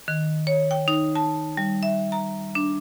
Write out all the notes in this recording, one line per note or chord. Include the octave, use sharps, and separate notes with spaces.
D#3
C#5
G5
D#4
A5
G3
E5
A#5
D4